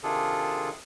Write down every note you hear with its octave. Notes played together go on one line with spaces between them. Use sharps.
C3 D#3 D4 F4 G#4 A4